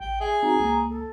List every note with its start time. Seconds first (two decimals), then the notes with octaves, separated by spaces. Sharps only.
0.01 A1 G5
0.21 G#4 E5
0.43 C4 D#4 F#4 A#5
0.59 C#2 A#3 A#5
0.90 A4